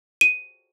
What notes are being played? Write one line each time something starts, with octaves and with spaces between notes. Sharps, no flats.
D#7